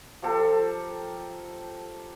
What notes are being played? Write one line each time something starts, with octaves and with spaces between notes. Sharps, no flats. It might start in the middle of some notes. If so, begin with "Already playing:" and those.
F3 G4 A4 A#4